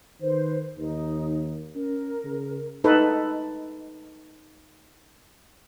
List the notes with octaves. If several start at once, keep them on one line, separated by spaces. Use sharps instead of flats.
D#3 B4 C5
D#2 D#4
C#4 A#4
C#3
D#4 A4 B4